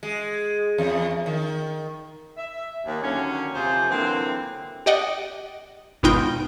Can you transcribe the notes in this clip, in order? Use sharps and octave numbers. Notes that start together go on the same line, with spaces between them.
G#3
E2
D#3
E5
D#2
D#2 D3 F#3 C#4
F2 C3 F3 F4 G#4 C5
D3 E3 F#3 A#3 C4
G4 D5 D#5 F#5 G5
G#1 B2 B3 D#4 F4 G5